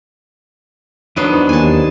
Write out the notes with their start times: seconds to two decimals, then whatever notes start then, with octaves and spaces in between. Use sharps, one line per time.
1.16 E2 F#3 B3 D4 D#4 C5
1.49 D#2 G#5 A5